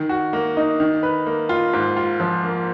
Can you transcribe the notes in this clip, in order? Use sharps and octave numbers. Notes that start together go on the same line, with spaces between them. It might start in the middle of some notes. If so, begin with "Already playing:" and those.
Already playing: D#3
F#4
A#3
D#4
D#3
B4
A#3
F4
G#2
F4
F3
A#3